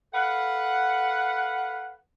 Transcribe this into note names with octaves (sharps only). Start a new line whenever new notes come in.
A4 B4 F5 F#5